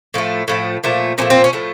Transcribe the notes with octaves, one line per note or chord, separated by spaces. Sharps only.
A2 F3 A3
A2 F3 A3
A#2 F3 A3
A#2 F3 A3 C#4
C4
C#4
A2 F3 A3